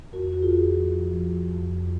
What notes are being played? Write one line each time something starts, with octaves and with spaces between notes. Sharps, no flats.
F2 F#4 A#4
F2 F#4
F4 G#4
F2
F3
F3
F3
F3
F2
F2